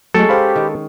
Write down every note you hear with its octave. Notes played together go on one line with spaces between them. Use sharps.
F#3 G#3 A3 C#4 A4 G5
G4 C5 F5 B5
D#3